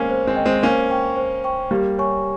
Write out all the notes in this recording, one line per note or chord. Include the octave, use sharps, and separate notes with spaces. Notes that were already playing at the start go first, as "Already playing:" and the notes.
Already playing: G#3 A#3 C4 C#4
C5
G#3 C4
D#5 G5
G#3 C4
A#3 C#4 C5
G5 C#6
C5
G5 C#6
G3 A#3 G4
C#5 G#5 C#6